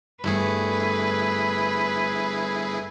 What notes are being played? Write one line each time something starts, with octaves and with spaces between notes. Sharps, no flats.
G1 G2 A3 E4 G#4 B4